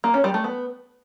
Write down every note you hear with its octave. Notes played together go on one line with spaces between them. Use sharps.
A#3
C#4
G3
A3
B3